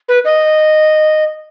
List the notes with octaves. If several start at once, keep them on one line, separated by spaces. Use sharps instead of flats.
B4
D#5